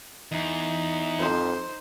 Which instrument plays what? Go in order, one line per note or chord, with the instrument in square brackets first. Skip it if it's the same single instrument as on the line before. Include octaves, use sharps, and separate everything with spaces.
[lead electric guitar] E2 [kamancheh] D#4
[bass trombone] F2 [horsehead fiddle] C5